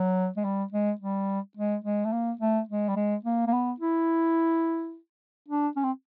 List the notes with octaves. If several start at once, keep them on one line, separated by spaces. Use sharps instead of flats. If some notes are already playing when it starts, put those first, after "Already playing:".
Already playing: F#3
G#3
G3
G#3
G3
G#3
G#3
A3
A#3
A3
G#3
G3
G#3
A#3
A#3
B3
E4
D4
C#4
C4